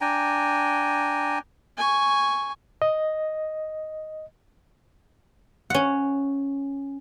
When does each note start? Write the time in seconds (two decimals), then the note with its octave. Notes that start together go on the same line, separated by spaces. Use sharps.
0.01 D4 G5 G#5 A#5
1.77 G#5 C#6
2.82 D#5
5.70 C#4 F#5